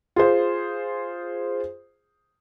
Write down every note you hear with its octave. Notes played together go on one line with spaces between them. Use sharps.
F4 G#4 C5